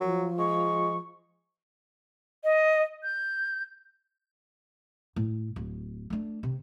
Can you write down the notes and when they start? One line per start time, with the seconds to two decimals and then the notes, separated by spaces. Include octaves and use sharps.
0.01 F3 F#3
0.38 G#3 C#6
2.44 D#5
3.03 G6
5.16 A2
5.56 D1
6.10 A3 D4
6.43 C3